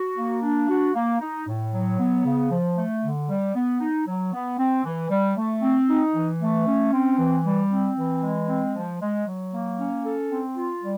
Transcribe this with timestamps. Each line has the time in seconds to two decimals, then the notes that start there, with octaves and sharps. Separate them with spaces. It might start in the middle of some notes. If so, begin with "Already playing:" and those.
Already playing: F#4
0.17 A#3
0.42 D4
0.68 F#4
0.94 A#3
1.20 D#4
1.47 A2
1.73 F#3
1.98 B3
2.24 C#3
2.50 F3
2.76 A3
3.03 D3
3.29 G3
3.54 B3
3.80 D#4
4.07 F#3
4.33 B3
4.58 C4
4.84 E3
5.10 G3
5.36 A3
5.62 C4
5.89 D#4
6.14 E3
6.40 A3
6.66 C#4
6.92 C4
7.18 E3
7.44 G3
7.70 C4
7.96 E3
8.23 G#3
8.48 C4
8.75 F3
9.00 G#3
9.26 F#3
9.52 A#3
9.78 C#4
10.04 A4
10.30 C4
10.56 F4
10.82 G3